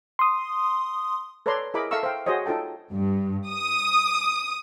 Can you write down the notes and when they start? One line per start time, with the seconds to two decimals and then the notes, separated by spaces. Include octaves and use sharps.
0.19 C6 D#6
1.46 A4 B4 C#5 D5 A#5 C6
1.74 E4 G#4 A#4 D#5 B5 D6
1.91 A4 E5 F5 A#5 C#6 E6
2.03 C5 F5 G5
2.26 F#4 G#4 C5 C#5 D#5
2.46 D#4 F4 A4 G5 A5
2.93 G2
3.51 D#6